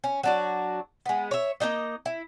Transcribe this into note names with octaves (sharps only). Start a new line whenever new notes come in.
C#4
F#3 D4 F#4
G#3 B3
C#5 E5
A#3 C4 D#4 D#5
E4